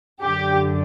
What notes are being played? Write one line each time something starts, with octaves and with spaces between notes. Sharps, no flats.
F#2 D3 G4